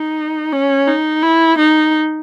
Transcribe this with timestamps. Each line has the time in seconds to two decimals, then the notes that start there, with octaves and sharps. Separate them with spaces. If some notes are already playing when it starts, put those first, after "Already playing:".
Already playing: D#4
0.52 C#4
0.87 D#4
1.23 E4
1.58 D#4